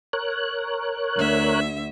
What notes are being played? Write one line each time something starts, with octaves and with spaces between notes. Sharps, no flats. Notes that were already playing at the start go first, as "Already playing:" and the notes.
A#4 C#5 F#6
D2 E5